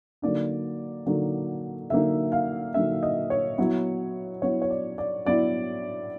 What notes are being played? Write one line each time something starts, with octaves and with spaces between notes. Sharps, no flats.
D3 F#3 A#3 D#4 D5
D3 F#3 A#3 D#4
D3 F#3 A#3 D#4 E5
F5
D3 F#3 A#3 D#4 E5
D#5
C#5
F#3 B3 E4
F#3 B3 E4 C#5
C#5
D5
D5
F#3 B3 E4 D5